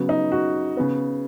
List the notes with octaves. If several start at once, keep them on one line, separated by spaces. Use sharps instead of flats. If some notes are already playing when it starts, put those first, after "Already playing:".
Already playing: C#3 F#3 B3
D#4
F#4
C#3 B3